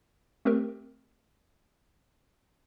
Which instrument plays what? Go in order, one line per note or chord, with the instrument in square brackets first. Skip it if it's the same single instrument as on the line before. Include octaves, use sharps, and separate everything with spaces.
[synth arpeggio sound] A3 C4 G4 A#4